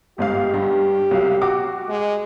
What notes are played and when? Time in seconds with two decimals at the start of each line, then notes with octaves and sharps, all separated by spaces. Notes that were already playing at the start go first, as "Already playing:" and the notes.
0.18 G1 G#2 G4 F5
0.54 G2
1.11 C2 F#3 F5
1.41 F#4 D6
1.89 G#3